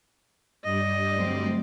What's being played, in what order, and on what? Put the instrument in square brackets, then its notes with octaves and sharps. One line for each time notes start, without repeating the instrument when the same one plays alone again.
[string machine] G2 G3 D5 [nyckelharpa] D#5
[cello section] D2 F#3 C4